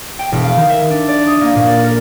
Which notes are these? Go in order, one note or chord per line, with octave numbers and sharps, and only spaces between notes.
G5
E1
F5
D#3
E5
D4
D5
D#6
A#3
A#2
D5
A#4